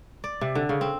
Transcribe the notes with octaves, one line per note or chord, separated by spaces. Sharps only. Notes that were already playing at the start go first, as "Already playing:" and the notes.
D5
C3
D3
C#3
C4